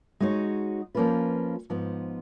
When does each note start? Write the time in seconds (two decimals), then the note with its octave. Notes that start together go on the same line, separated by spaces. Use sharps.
0.20 G#3 D#4 F#4 C#5
0.95 F3 A#3 C#4 F4 B4
1.70 G#2 F3 B3